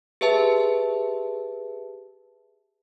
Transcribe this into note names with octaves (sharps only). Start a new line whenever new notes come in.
G4 G#4 B4 E5 A5